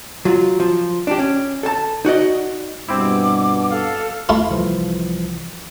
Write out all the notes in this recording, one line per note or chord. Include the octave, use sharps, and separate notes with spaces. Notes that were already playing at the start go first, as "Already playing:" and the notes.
F#3 F4
F3
D4 G4
C#4
A4 A5
D#4 F#4 D5 D#5
G2 B2 G3 C4 E4 D6
A4 F5
D#2 A3 E4 F4 C6
C2 E3 F3